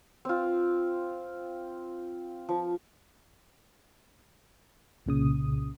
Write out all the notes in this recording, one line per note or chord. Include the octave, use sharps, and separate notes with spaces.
C4 F4
F3
C2 A#2 C#3 D#6